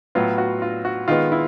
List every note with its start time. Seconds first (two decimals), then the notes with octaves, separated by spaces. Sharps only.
0.15 A2 F#3 B3 F4
0.38 F#4
0.62 F4
0.85 F#4
1.08 D#3 G#3 B3 F4
1.32 E4